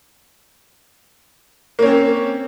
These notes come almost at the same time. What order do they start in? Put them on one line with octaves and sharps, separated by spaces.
A#3 C#4 C4